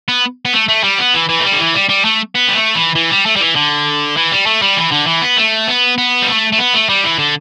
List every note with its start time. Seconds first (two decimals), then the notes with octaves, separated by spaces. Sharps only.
0.08 B3
0.45 B3
0.53 A3
0.69 A3
0.84 G3
0.99 B3
1.14 E3
1.29 E3
1.40 A3
1.44 G3
1.53 D3
1.59 E3
1.74 G3
1.89 G3
2.05 A3
2.35 B3
2.49 G3
2.55 A3
2.75 E3
2.95 E3
3.10 G3
3.26 A3
3.36 G3
3.41 E3
3.56 D3
4.17 E3
4.31 G3
4.46 A3
4.62 G3
4.77 E3
4.92 D3
5.07 E3
5.22 B3
5.37 A3
5.68 B3
5.98 B3
6.22 G3
6.28 A3
6.52 A3
6.59 B3
6.74 A3
6.89 G3
7.04 E3
7.18 D3